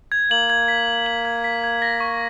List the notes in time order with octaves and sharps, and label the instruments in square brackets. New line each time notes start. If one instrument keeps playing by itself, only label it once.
[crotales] G#6
[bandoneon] A#3 [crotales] F#7
[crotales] G#6
B6
G#6
F#7
G#6
B6
G#6
A#6
C#6